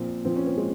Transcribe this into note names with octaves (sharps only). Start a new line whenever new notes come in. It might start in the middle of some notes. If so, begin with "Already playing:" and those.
Already playing: A#2 F3 C4
A#2 F3 C4
C#4
C4
G#3